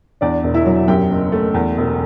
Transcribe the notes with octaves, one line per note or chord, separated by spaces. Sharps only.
E2 D4 D5
E1
E4 E5
F#3
F#2 G4 G5
F#1
A3
E2
E1